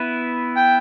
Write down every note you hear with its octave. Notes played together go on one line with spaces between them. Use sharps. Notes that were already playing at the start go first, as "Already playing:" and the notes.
Already playing: B3 E4 B4
G5